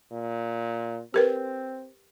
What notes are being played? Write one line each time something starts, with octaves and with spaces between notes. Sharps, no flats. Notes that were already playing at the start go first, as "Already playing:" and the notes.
A#2
C4 G4 A#4 B4